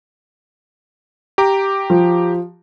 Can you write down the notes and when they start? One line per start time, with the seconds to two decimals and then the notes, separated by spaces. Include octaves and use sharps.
1.38 G4 A#5 D6
1.90 F3